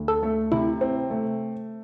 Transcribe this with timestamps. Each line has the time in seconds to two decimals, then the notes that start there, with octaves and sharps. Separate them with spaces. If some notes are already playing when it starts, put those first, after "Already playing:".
Already playing: D2 D3
0.08 A4
0.23 A3
0.52 C3 E4
0.81 C4
1.10 A3